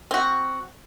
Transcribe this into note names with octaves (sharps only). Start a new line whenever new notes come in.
C4 F#4